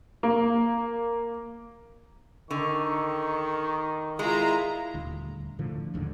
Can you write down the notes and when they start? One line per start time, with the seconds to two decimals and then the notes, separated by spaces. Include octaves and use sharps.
0.23 A#3
2.50 D3 D#3 C#6
4.19 G#3 E4 F4 A#5
4.94 D#1 D2
5.59 A2 D3 F3
5.94 D1 D#2 G#2 D3